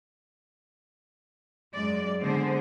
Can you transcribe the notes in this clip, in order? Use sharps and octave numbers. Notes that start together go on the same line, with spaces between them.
F#2 G#3 D5
D3 G#3 B3 G#4 C5